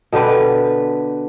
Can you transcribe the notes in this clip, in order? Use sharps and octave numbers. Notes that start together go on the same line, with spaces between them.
B2 D3 G4 B4